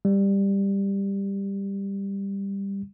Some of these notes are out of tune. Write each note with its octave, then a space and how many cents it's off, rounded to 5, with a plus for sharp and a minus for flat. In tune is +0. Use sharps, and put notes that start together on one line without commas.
G3 +10